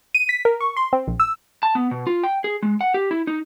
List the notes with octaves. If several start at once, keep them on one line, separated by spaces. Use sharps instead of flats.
D#7
B6
A#4
C#6
C6
C4
A#1
E6
A5
B3
B2
F4
G5
G#4
G#3
F#5
G4
E4
D#4